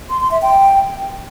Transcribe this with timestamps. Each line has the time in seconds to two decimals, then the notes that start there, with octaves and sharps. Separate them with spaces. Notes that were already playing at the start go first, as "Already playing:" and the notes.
0.10 C6
0.20 C6
0.31 E5
0.42 G5